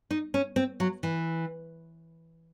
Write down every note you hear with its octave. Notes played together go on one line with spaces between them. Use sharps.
D#4
C#4
C4
F#3
E3